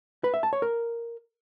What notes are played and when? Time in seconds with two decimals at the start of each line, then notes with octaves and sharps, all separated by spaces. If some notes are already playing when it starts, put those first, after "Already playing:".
0.24 B4
0.34 E5
0.43 A5
0.53 C#5
0.62 A#4